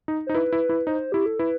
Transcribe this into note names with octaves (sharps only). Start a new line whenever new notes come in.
D#4
D#4 C5
E4 B4
E4
E4
D#4 C5
E4 G4
A4
E4 B4